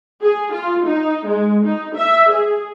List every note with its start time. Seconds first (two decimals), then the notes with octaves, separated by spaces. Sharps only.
0.23 G#4
0.53 F4
0.85 D#4
1.26 G#3
1.65 D#4
1.95 E5
2.30 G#4